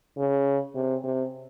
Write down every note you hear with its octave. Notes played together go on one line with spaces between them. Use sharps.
C#3
C3
C3